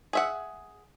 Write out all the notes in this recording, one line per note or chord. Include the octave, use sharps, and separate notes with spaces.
G#4 E5 F#5